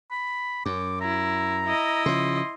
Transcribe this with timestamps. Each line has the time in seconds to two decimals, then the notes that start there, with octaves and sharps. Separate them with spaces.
0.11 B5
0.66 F#2 D6
1.01 E4 A#5
1.65 E4 D#5
2.06 C#3 F3 C6